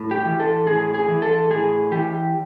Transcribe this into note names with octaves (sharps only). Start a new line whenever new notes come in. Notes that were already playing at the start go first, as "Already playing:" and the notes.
Already playing: A2
G4
E3
A4
A2 G#4
G#4
E3
A4
A2 G#4
E3 G4